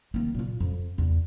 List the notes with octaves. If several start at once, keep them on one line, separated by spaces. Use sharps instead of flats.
D#3 A#3
A#2 F4
F2
E2